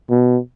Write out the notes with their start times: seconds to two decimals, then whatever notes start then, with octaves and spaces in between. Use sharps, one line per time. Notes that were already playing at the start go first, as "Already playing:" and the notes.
0.10 B2